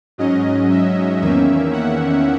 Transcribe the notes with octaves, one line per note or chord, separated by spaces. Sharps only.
G#2 F#3 C#4 D#5
E5
E2 D#3 A#3 C#4 E5
F#5